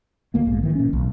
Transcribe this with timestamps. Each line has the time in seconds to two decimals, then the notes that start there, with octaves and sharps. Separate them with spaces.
0.34 D2 A#3 B3
0.47 A#1 G#2
0.63 D#3 E3
0.75 A#2 C#4
0.89 E1 B1